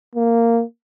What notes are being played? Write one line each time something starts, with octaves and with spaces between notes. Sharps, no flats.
A#3